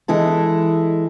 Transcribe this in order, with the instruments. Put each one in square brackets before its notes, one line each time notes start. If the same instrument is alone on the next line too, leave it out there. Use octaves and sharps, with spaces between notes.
[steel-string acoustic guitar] E3 G#3 E4 A4